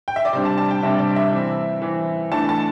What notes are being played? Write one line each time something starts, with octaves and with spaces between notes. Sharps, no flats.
G5
E5
D5
C3 G3 D4 C5
A5
A5
G5
C3 G3 D4 E5
D5
E5
E3 C4
E3 C4
E3 A3 D4 A5
A5